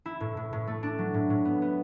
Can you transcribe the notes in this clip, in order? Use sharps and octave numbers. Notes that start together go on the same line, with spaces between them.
E4
A2
A2
A2
A3
D4
F#3
A2
A2
B3
B3